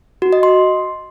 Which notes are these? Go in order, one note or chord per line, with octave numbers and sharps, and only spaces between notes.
F#4
D#5
C6